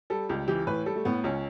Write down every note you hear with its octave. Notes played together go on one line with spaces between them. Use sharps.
G3 A4
C#2 G4
E3 G4
A2 B4
G3 A4
A3
A2 B3
C#2 C#4